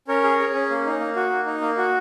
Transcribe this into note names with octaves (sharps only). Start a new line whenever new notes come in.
C#4 A#4 C#5
G#4
G#4
C#4
A#3
D#4
A#3
F#4
A#3
D#4
A#3
F#4